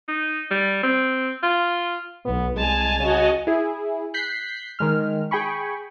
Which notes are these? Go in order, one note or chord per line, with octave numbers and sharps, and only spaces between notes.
D#4
G3
C4
F4
B1 B3
C2 G#3 G#5 A5 F7
C#3 F#4 D#5 G#5
E4 G#4
F#6 G6 B6 C7
D#3 G#3 F6
G#4 G5 G#5 B5 C#6